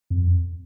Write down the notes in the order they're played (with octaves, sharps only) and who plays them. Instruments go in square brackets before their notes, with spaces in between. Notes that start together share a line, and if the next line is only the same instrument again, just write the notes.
[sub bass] F2